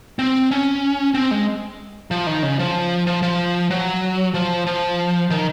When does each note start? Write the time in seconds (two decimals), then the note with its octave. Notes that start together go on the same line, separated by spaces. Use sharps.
0.19 C4
0.51 C#4
1.14 C4
1.31 G#3
2.11 F3
2.27 D#3
2.43 C#3
2.59 F3
3.07 F3
3.23 F3
3.70 F#3
4.34 F3
4.66 F3
5.30 D#3